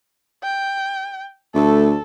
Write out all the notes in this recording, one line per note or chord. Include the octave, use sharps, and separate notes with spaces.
G5
D2 A3 A4